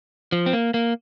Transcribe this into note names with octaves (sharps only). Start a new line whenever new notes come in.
F3
C4
A#3
A#3